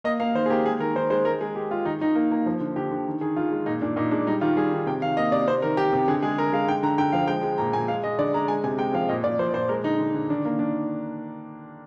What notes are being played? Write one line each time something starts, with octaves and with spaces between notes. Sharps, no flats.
A#3 D#5
A#3 F5
D#3 C5
G#4
A#3 G4
G#3 G#4
D#3 A#4
D#3 C5
G#3 C5
G#3 A#4
G#3 G#4
G#3 G4
G#3 F4
D#3 D#4
D#3 D#4
A#3
A#3
F3
D3
D3 G4
D3
D#3
D#3 G#4
D#3 F4
G#3
A#2 D#4
A#2 D4
A#2 D#4
G#3 D4
G3 D#4
D#3 F4
G3 G#4
D#3
C3 G5
D#3 F5
A#3 D#5
C3 D5
C3 C5
D#3 A#4
D#3 G4
C3
D3 G#4
G#3 G#4
D3 A#4
G#3 F5
D3 G5
D3 A#5
D3 G5
F3 F5
G#3 G5
G#3
A#2 A#5
A#2 G#5
G#3 F5
G#3 D#5
D3 D5
G#3 A#5
G#3 G#5
C3 G#5
G#3 G5
F3 F5
A#2 D#5
A#2 D5
F3 C5
A#2 C5
G#3 A#4
D3 D#4
D3
D3
D#3 D4
A#3
D#3 D4